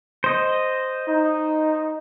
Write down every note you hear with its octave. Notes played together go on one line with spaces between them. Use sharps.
C5 D#5
D#4